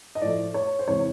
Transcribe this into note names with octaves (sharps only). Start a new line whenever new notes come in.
D#5
A2 F3 A3 D5
C#5
C5
E2 C3 E3 G#3 C#5